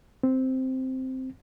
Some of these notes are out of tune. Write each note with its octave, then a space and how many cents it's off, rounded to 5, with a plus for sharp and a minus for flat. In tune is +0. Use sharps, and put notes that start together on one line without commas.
C4 -5